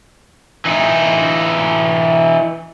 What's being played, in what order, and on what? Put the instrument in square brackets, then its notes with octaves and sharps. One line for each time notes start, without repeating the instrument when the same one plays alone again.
[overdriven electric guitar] E3 D#4